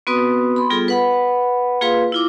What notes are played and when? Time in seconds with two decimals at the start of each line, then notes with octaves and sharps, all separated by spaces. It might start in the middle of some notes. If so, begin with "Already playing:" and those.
0.07 B3 C4 F#4 B4 D#6
0.56 B5 C6
0.70 G3 B3 F4 G#4 A4
0.88 B4 F#5 B5
1.81 A#3 F4 G#4 B4 F5 C6
2.12 E4 F4 D6